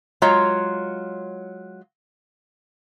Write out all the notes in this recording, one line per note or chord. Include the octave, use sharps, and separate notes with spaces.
F#3 G#3 F4 C#5 A#5